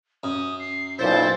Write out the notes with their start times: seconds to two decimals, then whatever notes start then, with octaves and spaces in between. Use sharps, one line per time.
0.24 F#2 D#6
0.60 C7
0.99 B1 A#2 E4 C5 A6